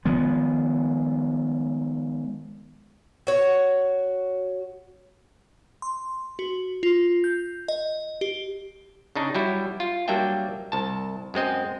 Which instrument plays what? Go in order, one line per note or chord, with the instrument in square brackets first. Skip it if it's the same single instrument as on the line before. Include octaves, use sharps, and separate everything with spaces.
[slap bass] D#3 F3 G#3 B3
[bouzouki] F#4 C#5
[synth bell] C6
F#4
F4
G6
D#5
G4
[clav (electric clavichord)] C#3 D4 D#4
F#3 G3 E4
F4
F#3 G3 A#3 D4 E5 G5
C2 A5
F#2 G#3 C4 D#5